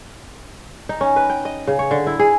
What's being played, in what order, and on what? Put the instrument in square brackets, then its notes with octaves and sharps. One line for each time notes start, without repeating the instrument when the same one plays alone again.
[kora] D#4
C#4
B4
G5
D#5
C#3
C#5
D3
E4
G#4